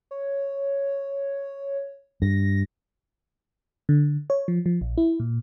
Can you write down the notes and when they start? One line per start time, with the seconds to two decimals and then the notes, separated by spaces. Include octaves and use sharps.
0.11 C#5
2.22 G2 A#6
3.89 D3
4.30 C#5
4.48 F3
4.66 F3
4.81 A#1
4.98 E4
5.20 A#2